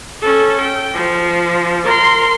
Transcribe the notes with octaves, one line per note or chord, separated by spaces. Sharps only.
C#4 A4
G5
F3
A#4 C6